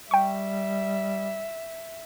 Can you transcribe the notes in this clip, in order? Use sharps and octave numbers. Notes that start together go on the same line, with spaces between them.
G3 E5 G5 C#6